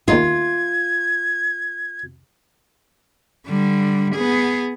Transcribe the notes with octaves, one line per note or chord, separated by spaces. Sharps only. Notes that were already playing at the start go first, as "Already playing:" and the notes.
D#2 D#4 F4 G#4 G#6
D3 G3
B3 G#4